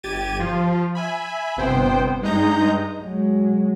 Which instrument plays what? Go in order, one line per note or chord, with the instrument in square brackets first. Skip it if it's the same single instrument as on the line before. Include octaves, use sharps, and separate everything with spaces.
[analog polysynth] G1 G4 G#6 A6 D#7
F3 F4
E5 G#5 B5
G1 C3 B3 C5 G5
G2 G#3 D#4 D#5 A#5 G6
[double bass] F#3 G#3